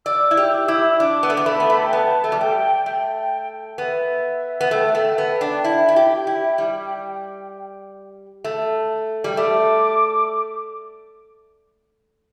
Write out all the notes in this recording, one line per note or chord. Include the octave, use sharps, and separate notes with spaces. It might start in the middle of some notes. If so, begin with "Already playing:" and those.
D5 E6
E4
G4
E6
E4 D6
E6
D4 D6
B3
A3
B3
A3 B5
B3
A3
G5
B3 A5
A3
G3
A3 G5
A3 G5
G5
B3 E5
B3
A3 G5
A3
B3
D4
E4
E4
G4
E4
G3
A3
G3
A3 D6